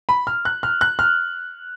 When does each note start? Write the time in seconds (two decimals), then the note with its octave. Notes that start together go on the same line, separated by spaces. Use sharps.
0.09 B5
0.27 F6
0.45 F#6
0.63 F6
0.81 F#6
0.99 F6